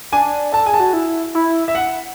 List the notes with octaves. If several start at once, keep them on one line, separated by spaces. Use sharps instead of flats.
D4 G#5
A4 A5
G#4 G#5
A5
F#4
E4
E4
E5
F#5